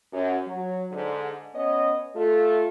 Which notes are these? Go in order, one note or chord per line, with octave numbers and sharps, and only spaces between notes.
F#2
F#3
G#2 D3 D4
B3 C#4 C#5 D#5
A3 F4 A4